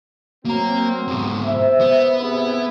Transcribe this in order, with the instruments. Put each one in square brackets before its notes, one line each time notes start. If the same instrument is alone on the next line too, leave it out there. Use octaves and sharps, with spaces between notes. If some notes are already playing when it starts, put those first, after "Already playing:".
[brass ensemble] F#3 C4 [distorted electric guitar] A#3 A#5
[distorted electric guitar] G#2 B2
[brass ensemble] C5 E5
[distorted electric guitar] B3
[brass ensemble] G#2 C3 E4